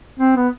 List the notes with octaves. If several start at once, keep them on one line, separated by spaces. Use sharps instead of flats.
C4
B3